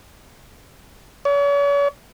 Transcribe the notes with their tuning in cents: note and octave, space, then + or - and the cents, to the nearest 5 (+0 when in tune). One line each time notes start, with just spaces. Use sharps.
C#5 +40